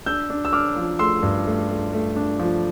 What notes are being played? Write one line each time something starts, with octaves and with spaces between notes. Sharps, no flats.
D4 E6 G6
D4
E6
D4 D6 F6
F3
A3 C6 E6
G2
A3
A3
A3
D4
F3